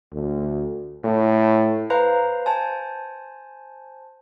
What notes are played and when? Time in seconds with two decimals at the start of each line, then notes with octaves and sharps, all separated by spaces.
0.13 D2
1.04 A2
1.90 B4 C5 F5 A#5
2.46 C5 G#5 A5